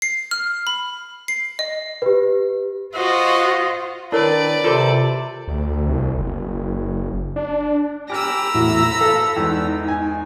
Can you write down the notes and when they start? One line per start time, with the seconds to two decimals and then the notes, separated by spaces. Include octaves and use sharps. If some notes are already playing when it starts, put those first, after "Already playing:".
0.02 C7
0.31 F6
0.67 B5
1.28 C7
1.59 D#5
2.02 G4 B4
2.95 F4 F#4 C5 D#5 F5
4.12 D#3 D4 E4 A#4 B4 C#5 D5
4.64 C3 F4 A4 A#4 C5 D6
5.48 D2
5.89 C2
6.17 F#1
7.36 D4
8.10 G4 G#5 A#5 B5 D6 E6 F6
8.55 E2 A2 E4 F#4
9.01 A4 F5
9.36 E2 G#3 D#4
9.88 G#5